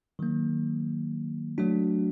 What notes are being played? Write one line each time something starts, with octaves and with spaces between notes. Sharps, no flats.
D#3 F#3 A#3
F#3 A3 D4 F#4